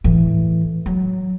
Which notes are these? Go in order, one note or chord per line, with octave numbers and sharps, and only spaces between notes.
A2 E3
F#3